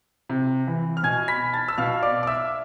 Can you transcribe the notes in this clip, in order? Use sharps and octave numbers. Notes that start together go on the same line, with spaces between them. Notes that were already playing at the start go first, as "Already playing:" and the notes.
C3
E3
F6
B2 G#5 G#6
B5 B6
A5 A6
E6
B2 F5 F6
D5 D6
D6
E5 E6